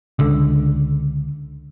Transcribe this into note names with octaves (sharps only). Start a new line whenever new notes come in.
C#2 D3